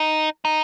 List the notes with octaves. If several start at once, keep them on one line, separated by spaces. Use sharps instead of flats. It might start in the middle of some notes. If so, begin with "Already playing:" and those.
Already playing: D#4
D#4